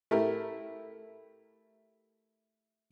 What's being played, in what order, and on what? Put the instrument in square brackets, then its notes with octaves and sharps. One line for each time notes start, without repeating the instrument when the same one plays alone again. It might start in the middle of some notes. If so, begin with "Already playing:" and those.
[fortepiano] A3 E4 G4 A#4